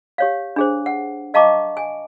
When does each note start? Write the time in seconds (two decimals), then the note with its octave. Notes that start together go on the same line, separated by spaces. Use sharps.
0.18 G4 C#5 F5
0.56 D4 G#4 C5
0.86 F#5
1.34 D#5 F5 A5 A#5 C#6 D6
1.77 G#5